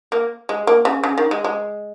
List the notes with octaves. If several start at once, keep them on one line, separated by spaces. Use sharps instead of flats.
A#3
G#3
A#3
C#3
C#3
D#3
G#3
G#3